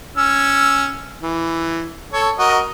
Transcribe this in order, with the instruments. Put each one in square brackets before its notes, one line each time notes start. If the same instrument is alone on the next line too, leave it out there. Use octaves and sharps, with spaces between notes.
[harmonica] C#4 E6
E3
A4 C#5
F#4 A#4 D#5